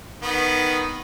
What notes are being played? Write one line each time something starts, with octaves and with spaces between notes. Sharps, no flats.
D#3 B3